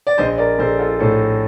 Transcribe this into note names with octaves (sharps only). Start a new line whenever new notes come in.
D5
A#1 C5 D#5
A#4 D5
A#1 A4 C5
F4 A4
A2 A4 C5